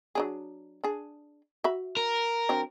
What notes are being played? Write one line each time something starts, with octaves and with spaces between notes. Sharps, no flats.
F#3 D4 G#4
D4 G#4
F#4 E5 B5
A#4
F#3 C4 D4